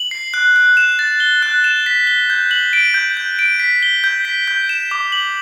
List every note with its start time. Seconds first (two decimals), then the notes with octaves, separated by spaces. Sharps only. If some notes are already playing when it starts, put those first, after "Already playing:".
Already playing: F#7
0.11 C7
0.34 F#6
0.56 F#6
0.77 E7
0.99 A6
1.20 G7
1.43 F#6
1.64 E7
1.86 B6
2.07 G7
2.30 G6
2.51 F#7
2.73 D7
2.94 G6
3.17 G6
3.39 D7
3.60 B6
3.83 G7
4.04 G6
4.25 B6
4.48 G6
4.69 E7
4.91 D6
5.12 F#7